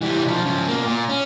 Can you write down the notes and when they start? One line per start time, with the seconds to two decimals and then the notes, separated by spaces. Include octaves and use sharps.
0.01 E3 G3
0.24 B1 F3
0.46 C#3 F3
0.68 B2 A#3
0.86 A#2
1.09 C#4